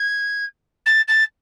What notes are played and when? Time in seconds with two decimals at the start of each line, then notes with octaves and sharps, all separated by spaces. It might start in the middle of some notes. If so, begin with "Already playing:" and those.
Already playing: G#6
0.86 A6
1.08 A6